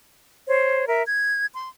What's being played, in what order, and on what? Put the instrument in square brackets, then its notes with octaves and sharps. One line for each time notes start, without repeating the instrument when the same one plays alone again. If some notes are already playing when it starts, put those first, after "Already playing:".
[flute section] C5 C#5
A#4 E5
G#6
C6